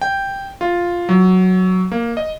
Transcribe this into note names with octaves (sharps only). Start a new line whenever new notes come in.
G5
F4
F#3
A#3
D#5